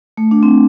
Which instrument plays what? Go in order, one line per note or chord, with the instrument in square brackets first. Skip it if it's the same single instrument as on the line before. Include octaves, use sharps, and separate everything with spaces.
[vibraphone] A3
D4
C4